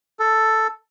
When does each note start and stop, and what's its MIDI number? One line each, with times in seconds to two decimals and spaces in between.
0.19 0.67 69